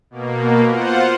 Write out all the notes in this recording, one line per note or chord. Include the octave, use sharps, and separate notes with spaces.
B2 A#3
F4 C5 F#5